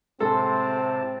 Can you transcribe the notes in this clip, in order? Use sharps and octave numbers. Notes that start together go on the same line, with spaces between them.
A2 C3 G#3 C4 A4 C5 A5